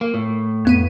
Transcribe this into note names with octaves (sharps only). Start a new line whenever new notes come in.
A#3
A2
F2 B3 D#7